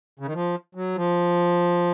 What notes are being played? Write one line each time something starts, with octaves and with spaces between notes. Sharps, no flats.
C#3
D#3
F3
F#3
F3